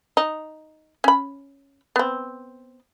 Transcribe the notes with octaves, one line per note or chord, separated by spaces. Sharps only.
D#4
C#4 B5
B3 C4